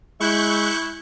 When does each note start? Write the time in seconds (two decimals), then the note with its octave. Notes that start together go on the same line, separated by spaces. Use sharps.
0.20 G#3 E4 C#6 F#6 G6